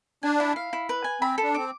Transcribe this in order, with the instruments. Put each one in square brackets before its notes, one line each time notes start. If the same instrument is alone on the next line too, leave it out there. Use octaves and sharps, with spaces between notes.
[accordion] D4 [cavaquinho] G#5
[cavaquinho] E4
F5
E4
B4
G#5
[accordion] C4 [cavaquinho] B5
[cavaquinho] A4
[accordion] D4
[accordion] C4 [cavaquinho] D6